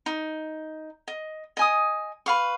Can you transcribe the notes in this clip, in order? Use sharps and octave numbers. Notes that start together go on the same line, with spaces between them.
D#4
D#5
D#5 G#5 D#6
B4 F5 C#6